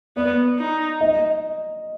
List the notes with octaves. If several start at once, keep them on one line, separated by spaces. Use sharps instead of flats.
B3 D5
D#4
D#5